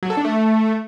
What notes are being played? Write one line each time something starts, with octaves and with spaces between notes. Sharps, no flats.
F#3
A4
D4
A3